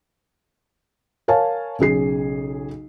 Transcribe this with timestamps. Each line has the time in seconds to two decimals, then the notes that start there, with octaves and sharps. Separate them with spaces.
1.28 A#4 C#5 F5 G#5 A5
1.79 B1 C#3 G#4 C7